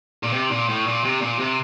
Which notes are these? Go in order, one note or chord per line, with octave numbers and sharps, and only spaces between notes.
A#2
C3
A#2
A2
A#2
C3
A#2
C3